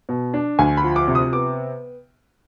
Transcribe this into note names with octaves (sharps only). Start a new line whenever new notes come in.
B2
D4
D2 G#5
B5
F3
D6
C3
D#6
B3 D6